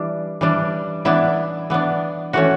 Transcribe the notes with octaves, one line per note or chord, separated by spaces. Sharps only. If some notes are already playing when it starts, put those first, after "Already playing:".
Already playing: E3 G3 D4
E3 G3 D4
E3 B3 D4 E4
E3 B3 D4
E3 A3 C#4 F#4